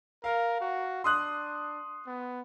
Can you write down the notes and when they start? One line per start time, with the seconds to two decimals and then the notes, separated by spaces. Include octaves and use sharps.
0.24 A#4 F5
0.61 F#4
1.04 D4 C6 D#6 F#6
2.07 B3